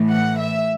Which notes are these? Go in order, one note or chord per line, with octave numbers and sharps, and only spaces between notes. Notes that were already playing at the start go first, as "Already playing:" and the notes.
Already playing: A2 E3
F#5
E5